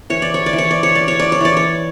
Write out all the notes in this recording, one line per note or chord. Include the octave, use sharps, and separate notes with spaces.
E3 C#5
D5
C#5
D5
E3
C#5
D5
C#5
C#4 D5
C#5
D5
C#5
E3 D5
C#5